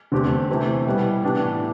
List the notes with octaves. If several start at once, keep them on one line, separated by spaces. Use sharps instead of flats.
E2 D3 A3 C4 G4
C3 E3 A3 C4
B2 G3 B3 E4
A2 E3 B3 D4 G4